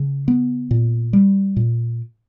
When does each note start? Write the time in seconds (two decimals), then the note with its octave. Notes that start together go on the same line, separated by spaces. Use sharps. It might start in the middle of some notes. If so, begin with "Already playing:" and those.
Already playing: C#3
0.28 B3
0.71 A#2
1.13 G3
1.56 A#2